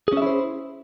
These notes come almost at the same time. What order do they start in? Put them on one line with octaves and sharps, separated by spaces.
G#4 C#4 E5 E4 C5